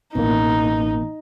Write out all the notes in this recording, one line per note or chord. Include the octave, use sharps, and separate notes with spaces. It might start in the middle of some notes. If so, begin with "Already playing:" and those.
A1 B2 E3 A#3 D#4